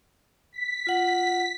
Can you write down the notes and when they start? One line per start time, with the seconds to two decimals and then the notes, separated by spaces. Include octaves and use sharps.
0.53 B6
0.87 F4 F#5